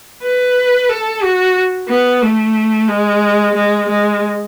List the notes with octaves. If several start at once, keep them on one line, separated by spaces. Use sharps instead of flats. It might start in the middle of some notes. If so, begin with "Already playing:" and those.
B4
A4
F#4
B3
A3
G#3
G#3
G#3